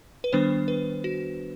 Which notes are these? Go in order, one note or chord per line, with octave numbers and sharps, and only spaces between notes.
B4
D#3 G3 B3 D4 C5
B4
F#4